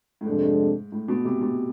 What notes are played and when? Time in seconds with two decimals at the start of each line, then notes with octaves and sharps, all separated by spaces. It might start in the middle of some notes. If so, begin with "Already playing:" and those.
0.21 A2
0.26 F2 G#2 C3 G#3 D4 A4
0.92 A2
1.08 B2
1.25 C3
1.41 B2